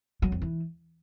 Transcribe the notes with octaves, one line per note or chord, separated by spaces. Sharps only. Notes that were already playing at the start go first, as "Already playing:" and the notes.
F#3
F2
E3